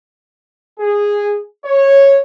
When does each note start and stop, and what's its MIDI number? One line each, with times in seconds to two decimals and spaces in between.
0.79 1.39 68
1.65 2.19 73